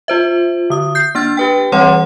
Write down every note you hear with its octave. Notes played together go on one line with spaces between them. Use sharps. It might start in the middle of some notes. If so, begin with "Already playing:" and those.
F4 C5 E5
D3 D#6
G6 C7
A#3 D4 F6 A6
G4 B4 G5
E3 G3 C4 C#5 F#5 C6